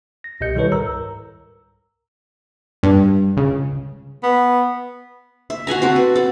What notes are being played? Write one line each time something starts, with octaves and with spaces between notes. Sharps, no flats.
A#6
C2 B2 G4 D#5 G6 C#7
D#3 G3 E4 A4 B4 C#5
C#2 G#2 A#4 A#5 E6
G2
C#2
B3
E5
F#4 F#5 G#5 A#5
C4 F#4 A4
B4
C4 A4